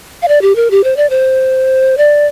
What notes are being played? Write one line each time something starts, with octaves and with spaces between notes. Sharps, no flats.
F5
D5
G4
A#4
G4
C5
D5
C5
D5